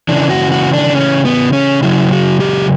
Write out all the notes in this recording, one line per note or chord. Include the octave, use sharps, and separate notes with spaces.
C#3 E3 D4
F#4
F#4
D4
C#4
B3
C#4
C#3 F#3 E4
F#4
G4